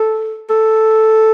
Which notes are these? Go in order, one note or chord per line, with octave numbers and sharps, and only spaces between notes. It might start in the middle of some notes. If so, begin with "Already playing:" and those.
Already playing: A4
A4